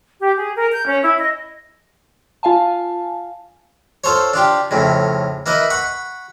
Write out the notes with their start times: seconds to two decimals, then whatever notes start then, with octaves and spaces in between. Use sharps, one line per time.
0.20 G4
0.39 G#4
0.57 A#4
0.73 G6
0.87 C#4
1.02 E4
1.19 D#5
2.43 F4 F5 G#5 A5
4.04 F4 A4 C5 C#5
4.33 D4 F4 G4
4.71 F2 A2 C#3
5.46 A#3 E4 B4 D#5
5.70 F#5 B5 C#6